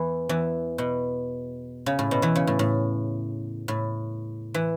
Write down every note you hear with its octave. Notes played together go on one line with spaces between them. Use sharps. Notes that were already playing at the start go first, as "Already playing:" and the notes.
Already playing: E2 E3
E2 E3
B2
C#3
A2
B2
E2 E3
C#3
A2
A2
A2
E3